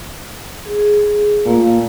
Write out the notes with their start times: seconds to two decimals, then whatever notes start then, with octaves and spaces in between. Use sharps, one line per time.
0.66 G#4
1.46 A#2 A3 A#3